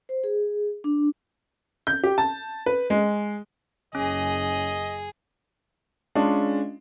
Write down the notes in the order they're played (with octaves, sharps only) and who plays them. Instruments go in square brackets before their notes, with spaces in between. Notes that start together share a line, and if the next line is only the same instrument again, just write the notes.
[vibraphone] C5
G#4
D4
[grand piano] G6
G4
A5
B4
G#3
[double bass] F#1 [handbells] C#4 [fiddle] G#4 [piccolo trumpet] D#5
[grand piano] G#3 C#4 D4 F4